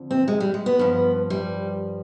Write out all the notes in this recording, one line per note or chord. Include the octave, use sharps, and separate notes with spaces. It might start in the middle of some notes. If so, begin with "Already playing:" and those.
Already playing: F2 D3 F3
C4
G#3
G3
G#3
B3
G2 F3
G3